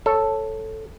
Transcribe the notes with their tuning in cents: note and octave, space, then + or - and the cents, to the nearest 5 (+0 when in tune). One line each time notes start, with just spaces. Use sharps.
A4 +0 C#5 -10